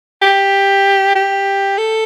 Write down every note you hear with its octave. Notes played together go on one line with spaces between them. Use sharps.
G4
G4
A4